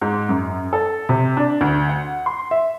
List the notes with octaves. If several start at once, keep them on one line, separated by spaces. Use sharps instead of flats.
G#2
F#2
A4
C3
D4
D2
F#5
C6
E5